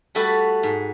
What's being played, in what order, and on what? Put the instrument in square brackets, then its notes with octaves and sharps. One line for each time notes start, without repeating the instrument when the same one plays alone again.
[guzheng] G3 A3 F#4 A4 B4
G#2